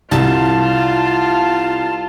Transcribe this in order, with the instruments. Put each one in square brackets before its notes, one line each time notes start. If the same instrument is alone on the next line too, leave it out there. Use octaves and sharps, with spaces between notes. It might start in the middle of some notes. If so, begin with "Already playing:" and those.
[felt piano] C2 [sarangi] F4 [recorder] A5